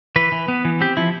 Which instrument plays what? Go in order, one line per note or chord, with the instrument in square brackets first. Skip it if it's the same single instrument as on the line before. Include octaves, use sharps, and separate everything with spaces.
[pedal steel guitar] E3 B4
E3
B3
E3
C4 G4
F3 E4